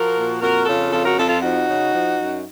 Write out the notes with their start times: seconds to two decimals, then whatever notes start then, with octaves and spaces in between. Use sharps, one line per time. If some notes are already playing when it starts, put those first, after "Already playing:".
Already playing: F3 F#4 A#4
0.16 A#2
0.40 F2 F#4 A#4
0.66 C#3 F4 A4
0.91 F2 F4 A4
1.04 F#4 A#4
1.16 F2 F4 A4
1.28 F4 A4
1.41 F3 D#4 F#4
1.67 C#3
1.92 F3
2.18 F#2